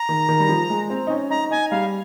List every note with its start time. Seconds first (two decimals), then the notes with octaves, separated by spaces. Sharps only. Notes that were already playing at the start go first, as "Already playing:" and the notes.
Already playing: A#5
0.09 D#3
0.29 D#3
0.40 G3
0.49 F3
0.70 G#3
0.90 C4
1.07 D#4
1.10 C#4
1.30 D#4 A#5
1.51 D#4 G#5
1.71 G3 F5